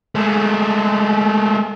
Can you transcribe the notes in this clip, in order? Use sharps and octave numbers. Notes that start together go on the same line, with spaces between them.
G#3 A3